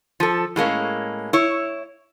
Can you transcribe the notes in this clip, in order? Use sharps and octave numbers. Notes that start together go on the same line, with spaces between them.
F3 A4
A2 G#3 A#3 C#4
E4 C#5